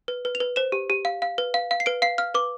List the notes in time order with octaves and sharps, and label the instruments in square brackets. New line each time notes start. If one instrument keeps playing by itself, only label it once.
[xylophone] B4
B4
F7
B4
C5 E7
G4
G4
F5
F5
B4
F5
F5
C7
B4 D7
F5 C7
F5 F6
B4 D6